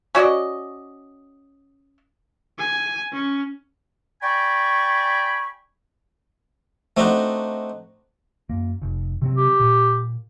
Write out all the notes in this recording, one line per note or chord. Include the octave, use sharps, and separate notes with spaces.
C#4 F#4 D5 D#5
G#5
C#4
D5 G5 G#5 B5 C#6
A3 C4 D4 D#4 F#4
F#2 A#3
F1
C3 F#3 C4
G4
A#2